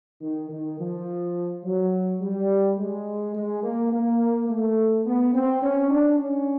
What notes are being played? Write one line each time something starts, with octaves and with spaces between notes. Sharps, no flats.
D#3
D#3
F3
F#3
G3
G#3
G#3
A#3
A#3
A3
B3
C4
C#4
D4
C#4